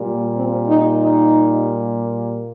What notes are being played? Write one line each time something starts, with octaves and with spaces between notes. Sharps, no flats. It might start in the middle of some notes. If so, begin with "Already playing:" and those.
Already playing: A#2 G3
C4
D#4
D#4